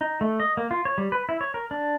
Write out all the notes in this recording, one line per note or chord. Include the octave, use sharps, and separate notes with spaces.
D#4
A3
D#5
A#3
F4
C#5
G3
B4
E4
C#5
A#4
D4